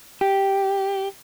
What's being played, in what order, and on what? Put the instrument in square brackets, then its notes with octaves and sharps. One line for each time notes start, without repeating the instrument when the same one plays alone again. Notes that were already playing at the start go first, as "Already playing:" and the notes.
[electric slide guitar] G4